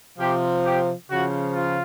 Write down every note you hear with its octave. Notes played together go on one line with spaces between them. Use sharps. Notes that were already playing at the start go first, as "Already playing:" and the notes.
C3 F3 G4
G4
C#3 F3 F#4
F4